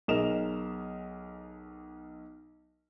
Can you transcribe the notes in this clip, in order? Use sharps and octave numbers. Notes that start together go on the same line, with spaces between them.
B1 G#4 A#4 D#5 E7 F7